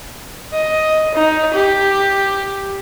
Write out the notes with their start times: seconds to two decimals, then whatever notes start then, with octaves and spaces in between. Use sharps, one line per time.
0.53 D#5
1.15 D#4
1.54 G4